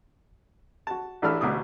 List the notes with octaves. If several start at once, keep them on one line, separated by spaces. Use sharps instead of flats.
F#4 A5
A1 E3 D4 A4 B5 F6
A1 D2 B2 D6 D#6